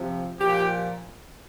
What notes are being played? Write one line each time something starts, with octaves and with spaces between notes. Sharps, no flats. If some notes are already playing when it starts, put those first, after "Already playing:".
Already playing: C3 F3
A#2 F3 G4